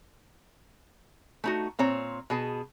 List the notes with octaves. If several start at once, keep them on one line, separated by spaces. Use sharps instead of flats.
A3 D#4 F#4
A#2 C4 C#5 A#5
B2 G#4 A5